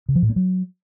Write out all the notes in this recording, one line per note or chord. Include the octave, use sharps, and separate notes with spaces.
C#3
F3
A2
A#3
F#3